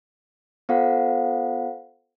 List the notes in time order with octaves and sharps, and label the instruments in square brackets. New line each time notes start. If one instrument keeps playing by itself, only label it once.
[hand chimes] B3 F4 A4 C5 F5 F#5